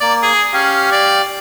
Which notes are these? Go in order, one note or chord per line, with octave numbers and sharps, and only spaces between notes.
A#3 D5
G#4
C#4 G4 F5
D5